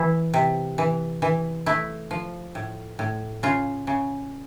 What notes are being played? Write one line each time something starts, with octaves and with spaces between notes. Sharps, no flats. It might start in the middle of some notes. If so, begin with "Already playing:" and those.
Already playing: E3 E4
C3
E3
E3
A3 E4
F3
A2
A2
C#3 F4
C#3